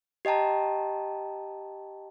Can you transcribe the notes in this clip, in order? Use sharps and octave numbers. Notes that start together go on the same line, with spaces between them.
G4 D#5 G5 A5 A#5